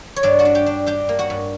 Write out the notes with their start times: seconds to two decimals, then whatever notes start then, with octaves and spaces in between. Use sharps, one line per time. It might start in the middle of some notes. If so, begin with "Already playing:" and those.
0.16 C#5
0.23 G2 D4 D5
0.39 F#4 F#5
0.45 D4
0.55 G4 G5
0.66 D4
0.86 D4 G4 G5
1.09 A#3
1.19 F#4 F#5
1.30 G2